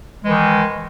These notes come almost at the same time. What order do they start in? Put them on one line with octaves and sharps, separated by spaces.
G#3 E3 D#3